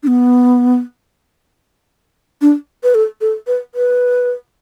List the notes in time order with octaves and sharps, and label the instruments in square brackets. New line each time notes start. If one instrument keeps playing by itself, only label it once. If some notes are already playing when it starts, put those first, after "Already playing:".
[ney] D4
B3
D4
B4
A4
A4
B4
B4